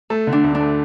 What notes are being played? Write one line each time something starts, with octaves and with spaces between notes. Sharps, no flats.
A3 A4
D3
D4
D2
D4
A3